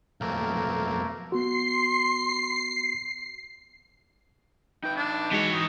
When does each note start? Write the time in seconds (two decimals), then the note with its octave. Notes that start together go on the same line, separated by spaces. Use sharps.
0.21 B1 F2 A3 A#3 A#4
1.32 B3 F#4 C6 C7
4.83 D#4 B4 G5
4.96 D4
5.31 E3 G#3 D#4 F#4 C#5
5.53 D#4 C#6